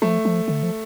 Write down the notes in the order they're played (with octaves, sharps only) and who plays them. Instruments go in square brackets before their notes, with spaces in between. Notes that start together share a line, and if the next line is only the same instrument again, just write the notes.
[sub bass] F3 [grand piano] A3
[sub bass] F3
D3
F3